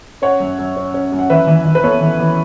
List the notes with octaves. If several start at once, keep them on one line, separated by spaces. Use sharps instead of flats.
C#4 C#5 F#5
F#2
F#2
C#4
C#4
F#2
F#5
E3 B4 E5
E3
E3
B4
B3 A4 C#5
E3
E3